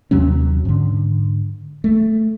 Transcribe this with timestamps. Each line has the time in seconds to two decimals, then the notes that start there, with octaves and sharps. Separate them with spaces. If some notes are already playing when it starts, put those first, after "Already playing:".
0.11 D#2 C3 F#3 C#4
0.65 G#2 D3
1.84 A3